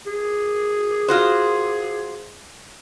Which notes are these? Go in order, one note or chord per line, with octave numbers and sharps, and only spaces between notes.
G#4
F4 F#4 C5